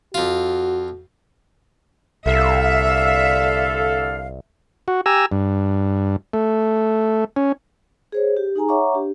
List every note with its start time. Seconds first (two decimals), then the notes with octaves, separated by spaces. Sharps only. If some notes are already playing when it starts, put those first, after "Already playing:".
0.14 F2 F4 F#4
2.26 C2 D3 A4 E5 F5
4.88 F#4
5.06 G4 G#5 A#5 E6
5.32 G2
6.33 A3
7.36 C#4
8.12 G#4 C5 C#5
8.37 G4
8.56 D#4 G#4 G#5 A#5
8.68 C#5 E5 F#5 A#5 C#6 D6
8.94 D4 G4